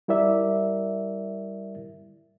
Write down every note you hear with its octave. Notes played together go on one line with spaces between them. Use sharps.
G3 E4 A#4 D5 E5